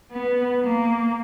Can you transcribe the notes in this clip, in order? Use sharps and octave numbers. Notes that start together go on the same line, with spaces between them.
B3
A#3